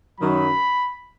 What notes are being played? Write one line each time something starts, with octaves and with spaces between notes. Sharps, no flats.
F#2 D#3 F#3 B5